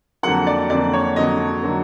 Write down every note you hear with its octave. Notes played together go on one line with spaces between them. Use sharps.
F2 D3 F#3 A#3 F#5
D5
F2 D3 F#3 A#3 D5
C#5
F2 D3 F#3 A#3 D#5
D3 F#3 A#3